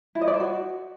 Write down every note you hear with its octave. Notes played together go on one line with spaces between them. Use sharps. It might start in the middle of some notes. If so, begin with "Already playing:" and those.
E4
D#5
D5
C5
F#4